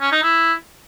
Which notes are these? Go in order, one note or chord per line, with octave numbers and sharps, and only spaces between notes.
C#4
D#4
E4